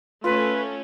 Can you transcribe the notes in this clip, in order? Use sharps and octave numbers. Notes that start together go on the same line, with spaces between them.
A3 C#4 F4 B4